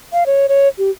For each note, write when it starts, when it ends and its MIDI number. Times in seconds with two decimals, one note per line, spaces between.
0.13 0.24 77
0.26 0.47 73
0.49 0.68 73
0.78 0.90 67